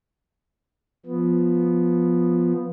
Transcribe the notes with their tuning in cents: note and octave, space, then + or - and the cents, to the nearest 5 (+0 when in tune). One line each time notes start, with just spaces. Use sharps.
F3 +0 B3 +0